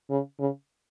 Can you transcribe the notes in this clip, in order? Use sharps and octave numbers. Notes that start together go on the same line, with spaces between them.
C#3
C#3